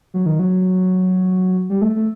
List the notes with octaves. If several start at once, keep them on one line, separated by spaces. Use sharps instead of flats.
F#3
D#3
F#3
G3
A3
A3